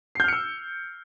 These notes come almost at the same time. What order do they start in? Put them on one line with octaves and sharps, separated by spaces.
C7 G6 F6 C#7 E6